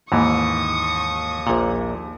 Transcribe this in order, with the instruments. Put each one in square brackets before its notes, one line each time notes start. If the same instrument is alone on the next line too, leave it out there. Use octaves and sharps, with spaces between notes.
[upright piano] D#2 [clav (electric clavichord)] G#2 E3 [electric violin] C#6 D#6
[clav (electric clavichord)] A#1 A#2